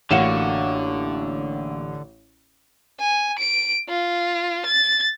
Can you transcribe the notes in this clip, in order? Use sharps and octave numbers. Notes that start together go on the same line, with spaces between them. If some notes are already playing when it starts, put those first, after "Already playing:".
A1 D3 A#3 F#4 E7
G#5
D7
F4
A6